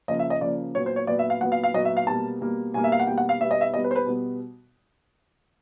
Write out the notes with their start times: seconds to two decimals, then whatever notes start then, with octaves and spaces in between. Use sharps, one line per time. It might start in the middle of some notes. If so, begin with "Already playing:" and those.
0.08 C#3 F3 A#3 D#5
0.19 E5
0.30 D#5
0.41 C#3 F3 A#3 D5
0.74 A#2 F#3 B3 C#5
0.86 C5
0.96 C#5
1.07 A#2 F#3 B3 D5
1.19 E5
1.30 F5
1.41 A#2 F#3 B3 F#5
1.52 F5
1.64 F5
1.74 A#2 F#3 B3 D#5
1.85 E5
1.97 F5
2.07 B2 G3 A#3 A5
2.41 B2 G3 A#3
2.74 B2 G3 A#3 G#5
2.84 E5
2.92 F5
3.00 F#5
3.07 B2 G3 A#3 G5
3.18 F#5
3.29 F5
3.40 B2 G3 B3 E5
3.51 D#5
3.61 E5
3.74 B2 G3 B3 D#5
3.84 B4
3.91 C5
3.96 B4
4.06 B2 G3 B3